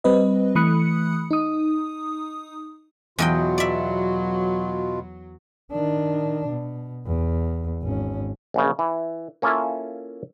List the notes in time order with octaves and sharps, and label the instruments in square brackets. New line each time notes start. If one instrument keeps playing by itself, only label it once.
[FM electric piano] G3 C4 B4 D#5
E3 A3 B5 D#6 F#6 C#7
D#4 D#6
[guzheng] E2 D#5 G5 [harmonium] B2 F4 [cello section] F#3
[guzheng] D5 E5
[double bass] D#3 D4
B2
E2
G#1 C#4
[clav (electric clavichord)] A#1 F#2 C#3
E3
A#3 C#4 E4 F4 A4 E5